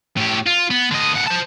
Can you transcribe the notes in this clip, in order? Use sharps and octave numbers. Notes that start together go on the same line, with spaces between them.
A2 G4
F4
B3
D3 D#5
A2 F#5
C5 A5